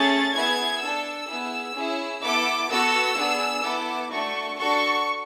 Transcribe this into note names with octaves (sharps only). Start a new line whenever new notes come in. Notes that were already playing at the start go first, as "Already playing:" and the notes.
Already playing: A3 C#4 G#4 A6
B3 E4 G#4 G#6
D4 A4 E6
B3 E4 G#4
C#4 E4 G#4
B3 E4 A4 D6
B3 F#4 A4 E6
B3 D4 G#4
B3 E4 A4 D6
A3 D4 F#4 A4 C#6
D4 F#4 A4 C#6